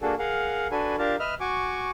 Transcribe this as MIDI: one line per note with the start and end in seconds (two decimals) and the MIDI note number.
0.01 0.15 58
0.01 0.15 62
0.01 0.15 66
0.01 0.15 68
0.01 0.15 69
0.19 0.67 68
0.19 0.67 70
0.19 0.67 77
0.19 0.67 78
0.71 0.96 62
0.71 0.96 66
0.71 0.96 69
0.71 0.96 71
0.71 0.96 80
0.99 1.16 62
0.99 1.16 65
0.99 1.16 67
0.99 1.16 70
0.99 1.16 81
1.19 1.35 71
1.19 1.35 75
1.19 1.35 76
1.19 1.35 89
1.40 1.91 66
1.40 1.91 80
1.40 1.91 85
1.40 1.91 86